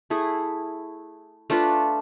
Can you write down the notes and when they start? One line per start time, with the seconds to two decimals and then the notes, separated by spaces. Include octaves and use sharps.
0.10 A3 E4 G#4
1.50 A3 D4 F4 B4